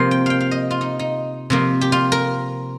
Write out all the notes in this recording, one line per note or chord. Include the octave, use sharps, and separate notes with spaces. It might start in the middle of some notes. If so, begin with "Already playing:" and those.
Already playing: C3 F3 A#3 C5
G5
F5 G5
F5
D#5
F4
D#4
D#4
C3 F3 A#3
G4
F4
A#4